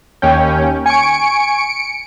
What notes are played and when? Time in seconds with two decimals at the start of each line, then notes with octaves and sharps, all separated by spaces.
0.22 D#2 C#4 G5
0.86 G#5 C#6 C#7 D7